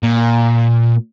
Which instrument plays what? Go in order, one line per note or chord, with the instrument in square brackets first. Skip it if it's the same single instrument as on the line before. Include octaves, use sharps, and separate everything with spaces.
[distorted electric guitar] A#2